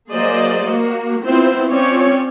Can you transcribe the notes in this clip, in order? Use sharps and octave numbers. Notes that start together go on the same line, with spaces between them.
F#3 A#3 G#4 C5 D5 D#5
A#3 F#4
B3 C4 E4 F4 C5
C4 C#4 F4 C#5 D5